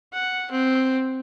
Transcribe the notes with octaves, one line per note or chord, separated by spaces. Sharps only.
F#5
C4